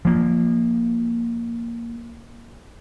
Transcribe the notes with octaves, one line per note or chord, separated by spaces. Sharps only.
F3 A#3